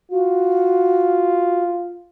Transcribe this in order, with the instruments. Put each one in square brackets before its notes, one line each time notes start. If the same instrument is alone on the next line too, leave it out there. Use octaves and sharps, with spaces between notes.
[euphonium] F4 [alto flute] F#4